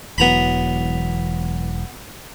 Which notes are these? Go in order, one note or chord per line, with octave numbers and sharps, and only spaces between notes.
E1 E3 F#3 B3 A#5 B5